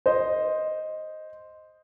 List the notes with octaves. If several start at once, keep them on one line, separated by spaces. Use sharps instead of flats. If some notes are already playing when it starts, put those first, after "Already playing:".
C5 D#5